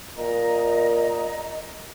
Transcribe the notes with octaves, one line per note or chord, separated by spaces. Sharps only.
A#2 A#4 D#5 A#5